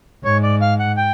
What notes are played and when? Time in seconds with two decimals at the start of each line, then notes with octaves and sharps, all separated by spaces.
0.24 G#2 C#5
0.43 D5
0.61 F5
0.79 F#5
0.97 G5